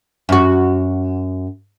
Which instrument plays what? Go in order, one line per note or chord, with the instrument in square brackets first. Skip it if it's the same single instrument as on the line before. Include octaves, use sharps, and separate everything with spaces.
[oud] F#2 F#4